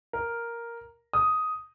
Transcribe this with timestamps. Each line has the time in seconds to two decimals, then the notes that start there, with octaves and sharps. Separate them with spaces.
0.13 A#4
1.13 D#6